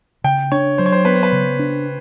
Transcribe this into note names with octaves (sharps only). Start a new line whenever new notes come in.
C#3 G5
D4 C#5
F#3 C5
C#5
C5
B3 B4
C5
B4
C#3
D4